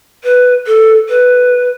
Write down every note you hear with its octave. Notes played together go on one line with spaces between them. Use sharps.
B4
A4
B4